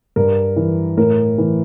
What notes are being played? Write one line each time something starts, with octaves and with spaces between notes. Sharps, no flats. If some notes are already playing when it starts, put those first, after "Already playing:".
G2 A#4
E3
A2 A#4
E3